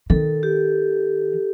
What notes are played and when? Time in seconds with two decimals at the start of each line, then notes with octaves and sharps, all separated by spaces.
0.10 D#3 A4
0.43 G4